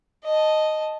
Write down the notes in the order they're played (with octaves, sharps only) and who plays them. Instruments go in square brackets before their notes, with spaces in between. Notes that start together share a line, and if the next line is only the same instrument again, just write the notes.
[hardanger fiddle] D#5 A5